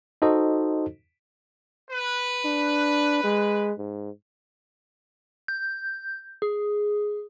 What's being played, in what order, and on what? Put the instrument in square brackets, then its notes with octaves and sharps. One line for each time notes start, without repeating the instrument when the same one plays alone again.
[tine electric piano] D#4 F#4 A4 C5 D#5
[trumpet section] B4
[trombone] D4
G#3
G#2
[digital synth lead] G6
G#4